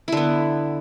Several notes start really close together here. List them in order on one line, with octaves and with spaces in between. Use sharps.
E4 D3 B3